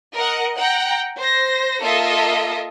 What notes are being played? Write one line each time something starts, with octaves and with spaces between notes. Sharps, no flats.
A#4 D#5 F#5
F#5 G5 A#5
C5 A#6
A#3 F4 A4 D#5 E5